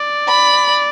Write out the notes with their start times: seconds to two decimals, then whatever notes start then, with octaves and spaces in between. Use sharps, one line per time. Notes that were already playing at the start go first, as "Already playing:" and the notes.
Already playing: D5
0.28 B5